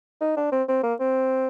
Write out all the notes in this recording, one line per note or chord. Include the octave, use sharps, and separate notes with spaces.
D#4
D4
C4
C4
A#3
C4